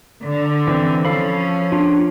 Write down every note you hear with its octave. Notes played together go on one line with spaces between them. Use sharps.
D3
E3 C4
F3 C#4 A4 F5 B5
D4 F4